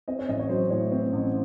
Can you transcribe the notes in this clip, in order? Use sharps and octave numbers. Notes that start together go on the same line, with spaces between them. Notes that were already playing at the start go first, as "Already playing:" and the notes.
C4 D#5
C#5
A1 D#5
C#5
F#3 C5
A2 C#5
C4
A1